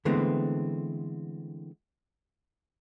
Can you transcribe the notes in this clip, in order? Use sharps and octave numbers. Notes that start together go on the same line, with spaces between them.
D3 E3 G#3 A3 B3 C4